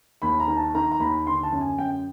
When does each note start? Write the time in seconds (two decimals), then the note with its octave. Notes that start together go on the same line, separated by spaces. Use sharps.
0.22 D#2 B5
0.40 A#5
0.48 D#3
0.57 A5
0.75 D#3 A#5
0.92 A#5
1.00 D#2 B5
1.26 D3 C6
1.43 A5
1.52 F#2
1.61 G#5
1.79 F#2 G5